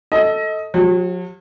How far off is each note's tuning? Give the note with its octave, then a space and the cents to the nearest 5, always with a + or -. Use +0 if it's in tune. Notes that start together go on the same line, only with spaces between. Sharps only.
A4 +0 D#5 +25
F#3 -45 G4 +0